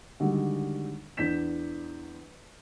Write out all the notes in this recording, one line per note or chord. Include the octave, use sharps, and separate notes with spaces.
D3 D#3 G3 G#3 F#4
E2 D4 G6 B6 E7